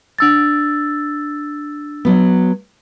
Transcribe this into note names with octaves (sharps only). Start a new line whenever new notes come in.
D4 E6 A6
F#3 B3